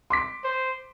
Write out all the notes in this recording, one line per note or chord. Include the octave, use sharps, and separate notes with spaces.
C6 D6 B6
C5